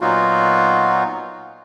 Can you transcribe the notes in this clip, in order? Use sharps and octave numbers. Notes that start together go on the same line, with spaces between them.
A#2 F#3 B3 D#4 F4 F#4